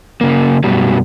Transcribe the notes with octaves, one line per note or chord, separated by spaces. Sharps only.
C#3 A#3
F#2 B2 F#3 G3